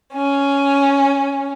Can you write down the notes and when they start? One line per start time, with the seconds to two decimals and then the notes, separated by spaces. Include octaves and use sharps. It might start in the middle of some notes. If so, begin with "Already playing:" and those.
0.13 C#4